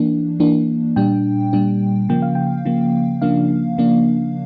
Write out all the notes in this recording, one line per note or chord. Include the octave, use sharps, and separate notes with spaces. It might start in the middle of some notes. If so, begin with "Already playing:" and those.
Already playing: E3 A#3 D4
E3 A#3 D4
A#2 G3 D4 G5
A#2 G3 D4
C#3 F3 A#3 G5
F5
G5
C#3 F3 A#3
C#3 F3 A#3 D4 F5
C#3 F3 A#3 D4